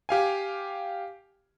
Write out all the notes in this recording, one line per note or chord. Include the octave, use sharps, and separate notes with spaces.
G4 F5 G#5